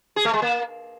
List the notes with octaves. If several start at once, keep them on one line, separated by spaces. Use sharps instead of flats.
G#4
A3
G#3
A#3